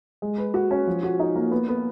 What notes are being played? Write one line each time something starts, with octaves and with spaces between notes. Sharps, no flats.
G#3
B4
F#4
C#4
F3
F#4
D#4
A#3
B3
B3